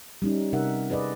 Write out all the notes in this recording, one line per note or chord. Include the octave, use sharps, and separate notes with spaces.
G3 C#4 D#4
C3 D#4 A#4 E5 F#5
G#4 B4 D5 D#5